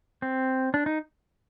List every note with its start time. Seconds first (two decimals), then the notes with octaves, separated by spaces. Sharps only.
0.22 C4
0.74 D4
0.86 D#4